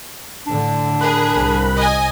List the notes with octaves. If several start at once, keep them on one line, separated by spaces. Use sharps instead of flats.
A2 D3 D4
G#4 A#4 B5 F#6
C2
D#5 G#5